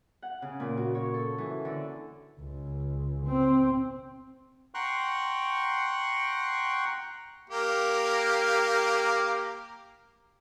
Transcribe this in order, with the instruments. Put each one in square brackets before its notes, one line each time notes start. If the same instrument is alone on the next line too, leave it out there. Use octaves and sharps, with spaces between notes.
[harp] F#5
C#3
A#2
F#4
C#5
A4
E3
D3
[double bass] C#2
C4
[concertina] F#5 G5 A#5 C6 C#6 F#6
[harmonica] A#3 G4 A#4